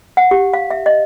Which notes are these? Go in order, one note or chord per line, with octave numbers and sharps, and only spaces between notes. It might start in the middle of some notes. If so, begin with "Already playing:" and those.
F#5
G4
F5
E5
D#5